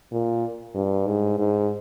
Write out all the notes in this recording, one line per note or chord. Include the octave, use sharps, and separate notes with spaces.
A#2
G2
G#2
G#2